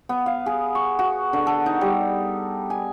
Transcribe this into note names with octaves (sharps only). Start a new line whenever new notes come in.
B3
F5
G#4
C#6
F#4
D3
A4
D#4
G3
G#5